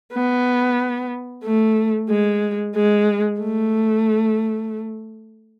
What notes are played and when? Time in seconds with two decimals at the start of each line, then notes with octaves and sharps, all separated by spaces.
0.13 B3
1.44 A3
2.09 G#3
2.75 G#3
3.40 A3